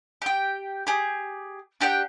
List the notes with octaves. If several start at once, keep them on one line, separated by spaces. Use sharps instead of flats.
G4 G5
G4 G#4
D4 G4 F#5 G5